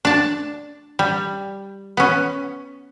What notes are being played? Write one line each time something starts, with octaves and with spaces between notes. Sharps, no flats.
D4 A5
G3
B3 C#4